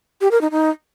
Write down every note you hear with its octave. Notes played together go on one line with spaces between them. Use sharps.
G4
A#4
D#4
D#4